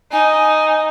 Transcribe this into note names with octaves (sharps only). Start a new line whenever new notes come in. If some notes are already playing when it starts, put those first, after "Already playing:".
D#4 G#5